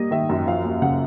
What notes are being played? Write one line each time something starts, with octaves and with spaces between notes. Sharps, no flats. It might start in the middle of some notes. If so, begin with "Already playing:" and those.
Already playing: G3 A#3 D#5
D#3 E5
F#2
F3 F5
D#2
C#3 F#5